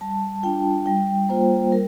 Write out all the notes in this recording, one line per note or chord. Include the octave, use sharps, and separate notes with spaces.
G3 A5
D4 F4 G5
G3 G5
A#3 F4 C5
G3 A#4